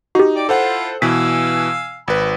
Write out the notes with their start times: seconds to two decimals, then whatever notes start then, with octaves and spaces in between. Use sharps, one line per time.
0.15 D#4 F#4 G4
0.36 D5 G5 D6
0.49 E4 F4 A4 C5 F#5
1.02 B2 E3 F5 G#5 E6 B6
2.08 G#1 B4 B5